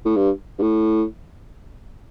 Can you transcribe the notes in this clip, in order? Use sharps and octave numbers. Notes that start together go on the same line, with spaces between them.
A2
G2
G2
A2